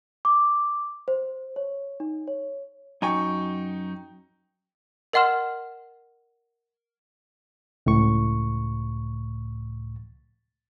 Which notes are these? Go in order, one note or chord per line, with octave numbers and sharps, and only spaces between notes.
D6
C5
C#5
D#4
C#5
F#2 D#4 G5 G#5 C#6
A#4 D#5 F#5 C6 F6 E7
C#2 A2 C#6